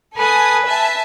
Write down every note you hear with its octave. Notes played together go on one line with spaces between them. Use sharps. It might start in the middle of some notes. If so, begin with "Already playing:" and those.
A4 B4 G#5 D#6
E5 G#5 A5